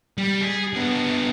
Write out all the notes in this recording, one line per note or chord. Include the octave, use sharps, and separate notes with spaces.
G3
G#4
D3 B3